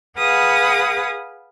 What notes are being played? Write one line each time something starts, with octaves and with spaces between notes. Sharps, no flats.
G#4 B4 F5 F#5 D#6